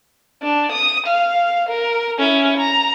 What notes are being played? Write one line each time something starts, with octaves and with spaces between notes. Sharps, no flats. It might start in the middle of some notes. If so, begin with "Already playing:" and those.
D4
D#6
F5
A#4
C#4 E4
A#5